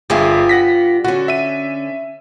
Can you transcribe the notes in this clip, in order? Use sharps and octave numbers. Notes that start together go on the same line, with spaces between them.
G1 G2 F4 G4 G#4 E5
F#5 A#6 B6
D3 C#4 F#4
E5 D#7